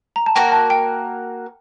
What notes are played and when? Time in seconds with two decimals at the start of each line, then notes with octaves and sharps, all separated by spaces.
0.16 A#5
0.26 A5
0.35 A#3 F#4 A#4 G5
0.52 A5
0.70 G5